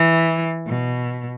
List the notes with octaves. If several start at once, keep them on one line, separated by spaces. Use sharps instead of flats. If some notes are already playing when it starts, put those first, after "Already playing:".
Already playing: E3
B2